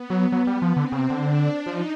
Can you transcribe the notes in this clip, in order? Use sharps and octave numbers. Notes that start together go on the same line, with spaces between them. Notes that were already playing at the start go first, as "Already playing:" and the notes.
Already playing: B3
F#3
F#3
G3
F3
D3 C4
C#3
C3
D3
D4
F3 D#4